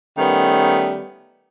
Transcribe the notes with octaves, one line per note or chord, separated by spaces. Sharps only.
D#3 G3 A3 B3 C#4